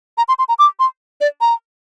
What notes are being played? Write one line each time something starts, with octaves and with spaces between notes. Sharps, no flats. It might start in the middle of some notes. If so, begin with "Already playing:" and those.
A#5
C6
C6
A#5
D6
C6
D5
A#5